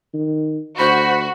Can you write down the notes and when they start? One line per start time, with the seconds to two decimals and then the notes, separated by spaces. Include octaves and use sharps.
0.14 D#3
0.79 D2 F#4 C5 B5